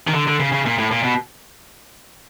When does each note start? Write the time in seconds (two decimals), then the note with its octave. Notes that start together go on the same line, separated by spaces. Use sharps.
0.07 D#3
0.14 D3
0.27 D3
0.40 C#3
0.52 C#3
0.66 A#2
0.78 A2
0.91 A#2
1.04 B2